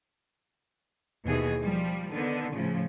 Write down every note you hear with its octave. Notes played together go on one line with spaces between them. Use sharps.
D#2 B2 E3 G#4
F3 G3
D3 D#3 B3
A2 C#3 F3